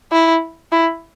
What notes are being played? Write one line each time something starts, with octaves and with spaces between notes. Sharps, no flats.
E4
E4